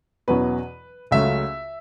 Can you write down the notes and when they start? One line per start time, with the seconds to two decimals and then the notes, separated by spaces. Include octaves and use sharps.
0.28 E2 B2 F#3 C#4 B4
1.11 C#2 C#3 F#3 A3 C#4 E5